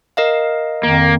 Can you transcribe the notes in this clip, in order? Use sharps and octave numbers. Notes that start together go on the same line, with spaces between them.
A#4 D#5 F5
F2 D#3 A#3